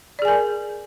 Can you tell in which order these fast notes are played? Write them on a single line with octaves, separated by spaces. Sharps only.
D5 G#4 G#5 A#4